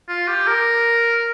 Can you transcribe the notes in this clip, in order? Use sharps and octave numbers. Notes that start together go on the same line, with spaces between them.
F4
G4
A#4